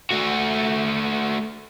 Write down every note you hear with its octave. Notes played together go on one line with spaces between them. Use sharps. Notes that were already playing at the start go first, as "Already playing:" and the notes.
A3 F#4